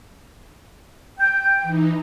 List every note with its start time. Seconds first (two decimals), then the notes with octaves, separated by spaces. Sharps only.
1.18 G5 G6
1.62 E3 D#4